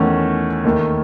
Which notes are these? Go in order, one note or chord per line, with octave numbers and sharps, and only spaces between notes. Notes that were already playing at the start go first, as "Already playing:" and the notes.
Already playing: E2 D#3 A3 C#4
D#2 D#3 A3